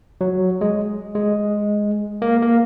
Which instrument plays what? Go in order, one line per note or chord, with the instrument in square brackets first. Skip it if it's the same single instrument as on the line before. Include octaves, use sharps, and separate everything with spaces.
[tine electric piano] F#3
G#3
G#3
A#3
A#3